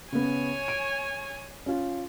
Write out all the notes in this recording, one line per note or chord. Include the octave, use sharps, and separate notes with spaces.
C#3 B3 C#5 G#5
D7
C#4 F4